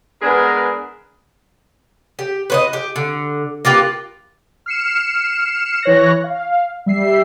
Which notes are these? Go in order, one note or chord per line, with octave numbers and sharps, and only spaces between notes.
G#3 B3 D4 G#4 A#4 B4
G4
B4 C5 D#5
G4
D3
A#3 F4 G4 B4
F6 C7 C#7 E7
E3 C#5 F#6 A#6
F5
G3 E5 C7